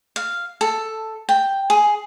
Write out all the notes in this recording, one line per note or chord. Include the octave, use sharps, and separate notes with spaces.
F5
A4
G5
G#4